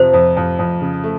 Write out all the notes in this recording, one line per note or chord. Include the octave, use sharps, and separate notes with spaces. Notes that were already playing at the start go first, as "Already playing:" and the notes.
Already playing: F2 C3 F3 C5
F2
F2
F2
C#3
A3